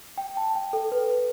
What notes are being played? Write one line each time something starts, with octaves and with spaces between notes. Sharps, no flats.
G5
A5
G5
A4
B4